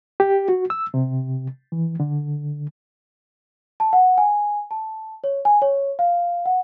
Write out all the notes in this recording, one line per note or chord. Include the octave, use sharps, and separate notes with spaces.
G4
F#4
E6
C3
E3
D3
A5
F#5
G#5
A5
C#5
G#5
C#5
F5
F#5